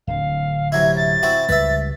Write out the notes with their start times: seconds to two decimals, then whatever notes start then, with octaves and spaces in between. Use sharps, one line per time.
0.07 D1 D3 F5
0.72 C3 F#3 E4 G#6
0.96 A6
1.23 C4 E4 F#4
1.49 C#2 G3 B4 E5